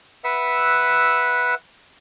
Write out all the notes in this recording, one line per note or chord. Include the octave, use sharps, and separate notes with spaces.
B4 E5 F#5 E6